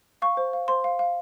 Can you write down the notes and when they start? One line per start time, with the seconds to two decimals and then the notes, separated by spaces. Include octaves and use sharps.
0.22 F5 C#6
0.37 C5
0.53 F5
0.68 C5 C6
0.84 F5
0.99 F5